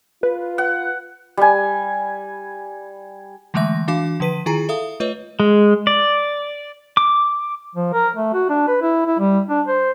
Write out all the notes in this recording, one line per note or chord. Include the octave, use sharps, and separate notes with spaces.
F4 B4
F#5
G3 G#5
D3 E3 G#3 A3 E5 A#6
E3 D4 F#4 F5 D6
D3 F3 B4 B6 D#7
D#3 E4 F4 G#4 G#5 A#5
A4 E5 F5 D#6
A3 F4 B4 C#5 D#5
G#3
D5
D6
F3
A#4
A3
F#4
D4
B4
E4
E4
G3
D4
C5